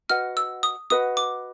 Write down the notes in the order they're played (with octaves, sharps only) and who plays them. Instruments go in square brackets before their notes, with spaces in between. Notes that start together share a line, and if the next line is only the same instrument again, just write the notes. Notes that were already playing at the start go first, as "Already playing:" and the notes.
[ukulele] F#4 B4 D#5 F#5 [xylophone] F6
[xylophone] E6
D#6
[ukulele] F#4 B4 D#5 F#5 [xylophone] D#6
[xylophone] D6